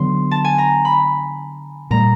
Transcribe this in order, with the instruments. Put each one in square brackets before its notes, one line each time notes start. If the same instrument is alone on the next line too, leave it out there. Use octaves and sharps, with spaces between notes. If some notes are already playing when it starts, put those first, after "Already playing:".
Already playing: [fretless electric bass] D3 F#3 B3 [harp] C6
[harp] A5
G#5
A#5
B5
[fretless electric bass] A#2 G3 A#3 [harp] A#5